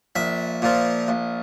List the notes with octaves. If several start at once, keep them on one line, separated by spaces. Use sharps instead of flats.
A#1 E5
A#2 F3
A#1